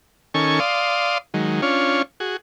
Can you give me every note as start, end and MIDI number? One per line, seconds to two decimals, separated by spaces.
0.34 0.60 51
0.34 0.60 61
0.34 0.60 69
0.34 0.60 80
0.34 0.60 85
0.60 1.18 74
0.60 1.18 77
0.60 1.18 84
0.60 1.18 87
1.34 1.61 51
1.34 1.61 54
1.34 1.61 56
1.62 2.02 61
1.62 2.02 62
1.62 2.02 65
1.62 2.02 73
2.20 2.37 66
2.20 2.37 68